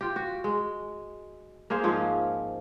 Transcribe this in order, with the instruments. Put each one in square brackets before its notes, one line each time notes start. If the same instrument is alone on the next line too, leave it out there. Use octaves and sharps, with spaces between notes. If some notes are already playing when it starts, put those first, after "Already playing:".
[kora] F4 G4
F#4
G#3
A#3 G#4 C5 F5
G#2 F3 C#4 F4